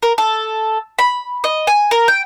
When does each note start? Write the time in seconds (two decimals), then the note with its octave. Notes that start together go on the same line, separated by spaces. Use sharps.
0.03 A#4
0.18 A4
0.99 B5
1.44 D#5
1.67 G#5
1.91 A#4
2.08 G5